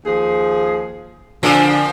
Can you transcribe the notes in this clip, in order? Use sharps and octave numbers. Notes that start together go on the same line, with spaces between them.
D#2 F3 G#4
A#2 D3 F3 C4